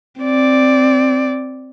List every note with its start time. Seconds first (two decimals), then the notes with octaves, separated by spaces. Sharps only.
0.21 C4 D5